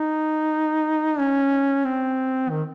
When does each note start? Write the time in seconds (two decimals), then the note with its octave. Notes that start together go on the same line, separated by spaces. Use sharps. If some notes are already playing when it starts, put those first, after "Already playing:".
Already playing: D#4
1.19 C#4
1.85 C4
2.50 D#3